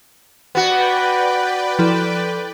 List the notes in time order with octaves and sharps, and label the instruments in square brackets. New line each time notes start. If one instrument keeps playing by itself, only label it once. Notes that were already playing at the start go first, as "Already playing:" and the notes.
[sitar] B3 F#4 [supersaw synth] B4 D5 G5
[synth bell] F3 E4 A4